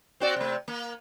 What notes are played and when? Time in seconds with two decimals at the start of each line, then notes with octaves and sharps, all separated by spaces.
0.20 C4 F#4 D5
0.36 C3 A3
0.68 A#3